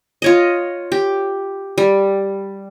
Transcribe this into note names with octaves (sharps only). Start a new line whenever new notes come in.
F4 C#5 D#5
G4
G3